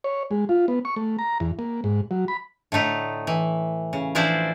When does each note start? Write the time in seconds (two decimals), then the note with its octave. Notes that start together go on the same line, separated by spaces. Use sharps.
0.04 C#5
0.31 G#3
0.49 F4
0.68 B3
0.85 C#6
0.96 A3
1.19 A#5
1.40 E2
1.59 A#3
1.84 G#2
2.11 F#3
2.28 B5
2.72 A2 D3 A3 D#4
3.27 E3
3.93 C#3
4.15 E3 F3 D4 E4 C5 D5